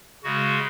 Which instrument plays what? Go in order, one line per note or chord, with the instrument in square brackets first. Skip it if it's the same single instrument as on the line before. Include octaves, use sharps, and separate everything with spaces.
[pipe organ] C#3 G#3 F#4